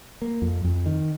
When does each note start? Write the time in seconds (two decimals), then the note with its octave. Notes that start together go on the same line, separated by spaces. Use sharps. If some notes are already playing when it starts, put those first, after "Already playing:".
0.22 A#3
0.42 F2
0.64 F2
0.86 D#3